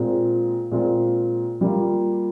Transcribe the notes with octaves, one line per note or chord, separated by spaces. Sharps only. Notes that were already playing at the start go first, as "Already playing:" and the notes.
Already playing: A#2 G#3 C4 F4
A#2 G#3 C4 F4
G3 A#3 F4